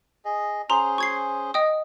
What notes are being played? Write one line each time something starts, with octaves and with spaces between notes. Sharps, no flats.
G#4 D#5
C#4 G#4 C5 A#5 C6
C#6 G#6 C7
D#5 G5 D#6